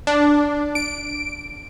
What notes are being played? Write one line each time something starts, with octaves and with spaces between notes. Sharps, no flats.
D4
D7